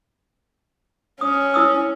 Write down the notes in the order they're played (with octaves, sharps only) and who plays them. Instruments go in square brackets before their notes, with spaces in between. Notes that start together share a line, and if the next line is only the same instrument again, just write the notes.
[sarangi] C#4 [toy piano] D#6
[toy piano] E4 D#6 E6